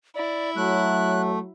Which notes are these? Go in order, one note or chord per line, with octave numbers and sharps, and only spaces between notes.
E4 D5
F#3 A3 F#6